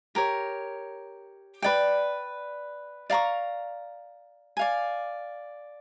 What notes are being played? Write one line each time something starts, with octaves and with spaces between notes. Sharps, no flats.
G4 A#4 C#5
B4 D5 G5
D5 F5 A#5 C#6
D5 F5 G#5